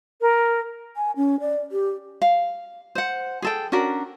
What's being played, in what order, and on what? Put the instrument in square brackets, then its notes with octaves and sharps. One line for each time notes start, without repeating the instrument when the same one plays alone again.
[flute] A#4
[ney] G#5
C#4
D5
G4
[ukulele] F5
C5 F#5
G#4 A4 G5
C#4 D4 F#4 A#4